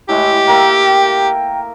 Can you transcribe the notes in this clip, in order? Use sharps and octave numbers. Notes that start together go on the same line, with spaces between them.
A2 G#3 E4 G4 C#6
A#3 A#4 E5 G5